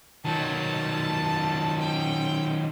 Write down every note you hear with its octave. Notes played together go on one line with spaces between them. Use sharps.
D#3 F#3 A5
G5